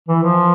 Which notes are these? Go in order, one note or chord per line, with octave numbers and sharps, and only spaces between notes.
E3
F3